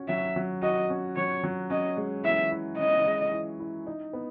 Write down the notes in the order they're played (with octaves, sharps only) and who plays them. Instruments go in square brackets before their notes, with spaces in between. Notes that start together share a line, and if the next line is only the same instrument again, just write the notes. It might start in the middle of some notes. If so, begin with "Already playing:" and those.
Already playing: [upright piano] C#4 F#4
[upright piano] F#3 [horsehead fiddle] E5
[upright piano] F#3
[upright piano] F#4 [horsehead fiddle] D#5
[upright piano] C#4
[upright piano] F#3 [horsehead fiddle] C#5
[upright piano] F#3
[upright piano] C#4 [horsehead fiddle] D#5
[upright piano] G#3
[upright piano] E3 [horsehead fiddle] E5
[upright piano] E4
[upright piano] C#4 [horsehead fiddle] D#5
[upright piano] G#3
E3
E4
D#4
B3